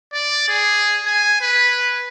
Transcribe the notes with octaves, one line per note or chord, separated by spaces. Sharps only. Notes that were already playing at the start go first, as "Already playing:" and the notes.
D5
G#4
G#5
B4